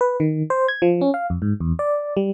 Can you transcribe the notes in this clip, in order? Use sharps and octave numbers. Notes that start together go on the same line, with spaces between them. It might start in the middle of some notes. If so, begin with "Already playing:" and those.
B4
D#3
C5
G#6
F3
C#4
F5
F2
G#2
E2
D5
G3